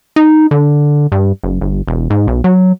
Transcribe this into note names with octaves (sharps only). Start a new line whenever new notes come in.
D#4
D3
G2
F#1
G1
E1
G#2
B1
F#3